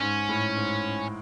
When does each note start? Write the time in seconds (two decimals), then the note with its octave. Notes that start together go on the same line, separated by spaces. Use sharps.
0.01 G#2 C#4
0.29 A2
0.56 G#2